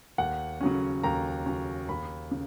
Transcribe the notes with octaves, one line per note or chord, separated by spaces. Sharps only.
D#2 F#5
C#3 F#3 C#4
D#2 A#5
C#3 F#3 C#4
D#2 B5
C#3